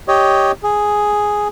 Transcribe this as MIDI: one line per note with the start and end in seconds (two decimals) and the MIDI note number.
0.08 0.52 67
0.08 0.52 73
0.08 0.52 75
0.63 1.48 68